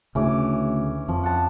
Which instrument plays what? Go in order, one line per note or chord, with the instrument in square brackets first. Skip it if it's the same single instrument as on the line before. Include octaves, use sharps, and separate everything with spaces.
[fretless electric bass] D2 C#3 [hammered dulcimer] E3 C#4 D6
[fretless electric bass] F2 [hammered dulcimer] F3
[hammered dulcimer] F#5 A5